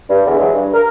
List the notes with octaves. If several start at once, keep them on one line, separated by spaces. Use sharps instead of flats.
G2
E2 D3
E3 F#3 G#3
G2
A#4